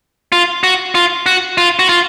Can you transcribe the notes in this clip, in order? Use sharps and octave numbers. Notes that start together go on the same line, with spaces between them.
F4
F#4
F4
F#4
F4
F#4
F4